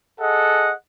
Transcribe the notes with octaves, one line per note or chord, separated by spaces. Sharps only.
G#4 A4 D#5 F#5